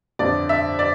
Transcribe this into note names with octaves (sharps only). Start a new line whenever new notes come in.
G1 F2 D3 D5
E5
D5